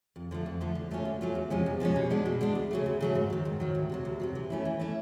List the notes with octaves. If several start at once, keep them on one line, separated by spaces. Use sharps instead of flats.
F2
D3 F3 A3
F2
D3 F3 A3
D3
F#3 A3 C#4 F4
D3
F#3 A3 C#4 F4
E2
C3 F3 G#3 C#4
E2
C3 F3 G#3 C#4
B2
G#3 B3 D4
B2
G#3 B3 D4
D2
C#3 F#3 A3
D2
C#3 F#3 A3
G#2
D#3 F#3
G#2
D#3 F#3
D2
C3 D#3 F#3
D2
C3 D#3 F#3
E3
A3 C#4 E4
E3
A3 C#4 E4